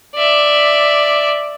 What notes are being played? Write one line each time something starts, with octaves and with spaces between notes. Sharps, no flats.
D5 E5